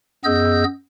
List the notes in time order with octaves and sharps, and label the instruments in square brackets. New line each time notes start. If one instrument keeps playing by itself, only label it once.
[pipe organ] F#2 B3 G#4 D#5 E6 G6